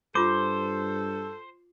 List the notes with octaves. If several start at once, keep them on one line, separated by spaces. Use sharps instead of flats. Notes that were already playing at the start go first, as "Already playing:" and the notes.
G2 F4 A4 C5 D6